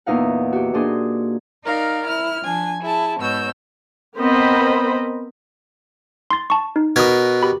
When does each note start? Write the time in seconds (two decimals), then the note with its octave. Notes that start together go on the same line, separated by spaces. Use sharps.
0.06 E2 A#2 D#4 F5 F#5
0.53 F#4 G4
0.74 A#2 A#3 D4 G#4 C6 D#6
1.65 D#4 A#4 D5 F5
2.07 E4 F6
2.44 F3 D4 G#5
2.82 E4 G#4 A5
3.18 G#2 B2 C#5 E6 G6
4.19 B3 C4 A#4 C5 D#5 B5
6.30 C6 A6
6.50 A5 C#6
6.76 D#4
6.96 B2 A#4 B4 D#6 G#6
7.43 G4 B5